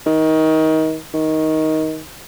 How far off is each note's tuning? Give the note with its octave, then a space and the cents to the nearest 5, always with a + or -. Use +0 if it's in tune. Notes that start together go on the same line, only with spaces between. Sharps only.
D#3 +25
D#3 +15